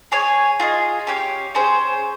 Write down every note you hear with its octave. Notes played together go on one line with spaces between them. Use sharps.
G#4 C#5 G#5
F4 G#4 D#5
C#4 G4 C#5 F5
C#4 G#4 C5